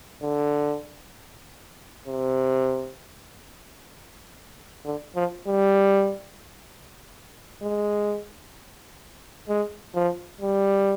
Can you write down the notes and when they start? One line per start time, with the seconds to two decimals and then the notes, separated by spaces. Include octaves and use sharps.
0.22 D3
2.07 C3
4.85 D3
5.16 F3
5.47 G3
7.63 G#3
9.48 G#3
9.94 F3
10.41 G3